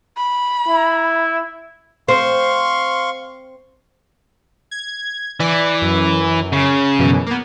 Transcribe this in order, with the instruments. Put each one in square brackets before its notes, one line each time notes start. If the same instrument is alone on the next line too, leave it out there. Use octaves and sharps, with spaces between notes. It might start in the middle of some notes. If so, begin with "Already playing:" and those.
[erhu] B5
[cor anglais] E4
[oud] C4 [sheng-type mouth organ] F5 C6 C#6
[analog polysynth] G#6
[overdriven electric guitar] E3 [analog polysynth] D5
[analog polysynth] F#2
[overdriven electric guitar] C#3
[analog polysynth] F#2 B2 E3
A#3 B3